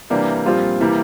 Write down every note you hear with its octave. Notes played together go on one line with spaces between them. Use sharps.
C3 E3 G3 A#3 D4
A#2 F3 G3 C4 F4
C3 E3 G3 A#3